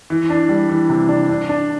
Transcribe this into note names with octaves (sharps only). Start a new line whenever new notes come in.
E3
D4
G3
E3
C3
D4
D4
D4